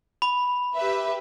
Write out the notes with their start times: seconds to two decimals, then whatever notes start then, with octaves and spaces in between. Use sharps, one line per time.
0.22 B5
0.75 G4 B4 E5